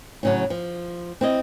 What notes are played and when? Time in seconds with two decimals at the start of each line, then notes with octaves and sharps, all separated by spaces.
0.23 A2 C#3 F#3
0.50 F3
1.21 C4 E4 D#5